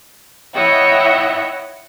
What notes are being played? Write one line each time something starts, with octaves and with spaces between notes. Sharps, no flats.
E4 C#5 D#5 E5 F#5 G5